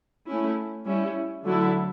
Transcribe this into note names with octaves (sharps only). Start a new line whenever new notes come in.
A3 C#4 E4
G3 C#4 E4
D3 F#3 A3 E4 A4